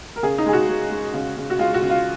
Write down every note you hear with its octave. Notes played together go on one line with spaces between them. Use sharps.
A#4
C#3 G#4
D#4
G#3 G#4
F#4
G#3
G#3
C#3
C#3
F#4
G#3 F4
F#4
C#3
F4